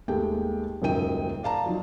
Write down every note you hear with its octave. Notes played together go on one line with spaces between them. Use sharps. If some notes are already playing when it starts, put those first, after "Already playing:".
D#2 G#3 A3 G4 G5
D#1 C#2 F#2 D#4 G5 D#7
D5 F5 A5 A#5
F3 F#3 D#4